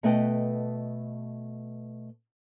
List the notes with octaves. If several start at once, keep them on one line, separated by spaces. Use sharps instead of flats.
B2 A3 B4 D#5 G5